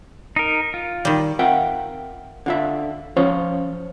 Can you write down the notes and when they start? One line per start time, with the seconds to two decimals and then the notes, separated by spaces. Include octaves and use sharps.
0.36 D#4 A#4
0.74 F4
1.05 D#3 G3
1.39 C4 F4 A#4 E5 F#5 G5
2.46 D3 F4 E5
3.16 F3 C#4 F4 C5 C#5